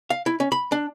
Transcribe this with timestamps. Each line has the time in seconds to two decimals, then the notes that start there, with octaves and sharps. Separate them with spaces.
0.10 F5
0.26 E4
0.40 C#4
0.52 B5
0.72 D4